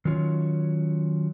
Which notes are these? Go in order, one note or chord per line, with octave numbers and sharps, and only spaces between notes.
D#3 F#3 C#4 F4 C#5